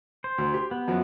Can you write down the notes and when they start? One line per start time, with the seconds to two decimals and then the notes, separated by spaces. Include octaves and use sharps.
0.24 C5
0.38 D2
0.54 G4
0.71 B3
0.88 F#2 F3 F#3